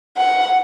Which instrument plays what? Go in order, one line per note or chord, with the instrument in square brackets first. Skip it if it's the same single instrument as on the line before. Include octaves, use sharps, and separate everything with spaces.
[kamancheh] F#5